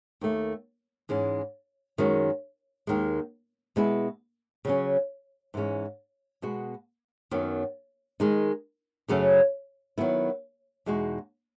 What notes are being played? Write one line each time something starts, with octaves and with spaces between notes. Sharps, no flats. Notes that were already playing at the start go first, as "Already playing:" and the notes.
D#2 D#3 A3
G#2 E3 G#3 C#4
F#2 D#3 G#3 C#4 F#4
D#2 D#3 G#3
B2 G#3 B3 E4
C#3 F#3 C#4
G#2 E3 G#3 C#4
B2 G#3 B3 F#4
F#2 D#3 F#3 B3
D#3 G#3 D#4
F#2 C#3 F#3 A3 C#4
D#3 F#3 B3 E4
E2 B2 G#3 D#4 F#4